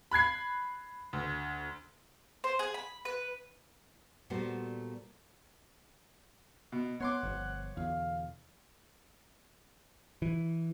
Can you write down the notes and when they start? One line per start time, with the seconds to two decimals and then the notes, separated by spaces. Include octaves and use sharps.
0.11 B5 F#6 G#6 C7
1.13 D2
2.44 C5
2.59 G#4
2.74 B5
3.05 B4
4.30 A#2 G3 A3 B3 F#4 C5
6.72 B2
7.00 B3 C#5 F#5 C6 D6
7.23 G1 F3
7.77 E2 B2 D3 F5
10.22 E3